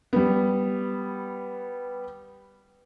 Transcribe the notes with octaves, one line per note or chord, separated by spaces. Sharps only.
G3 B3